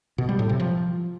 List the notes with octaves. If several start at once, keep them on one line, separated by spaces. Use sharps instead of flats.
B2
G3
A2
C3
F3